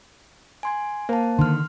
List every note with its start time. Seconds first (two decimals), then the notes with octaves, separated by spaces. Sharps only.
0.63 G#5 C6 G#6
1.09 A#3 C5 A5
1.39 D3 D#3 C6 F6